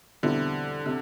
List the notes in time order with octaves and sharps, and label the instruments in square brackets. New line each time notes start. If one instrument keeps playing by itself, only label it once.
[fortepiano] E2 B2 G3 C4 E4 [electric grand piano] D3
[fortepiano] C3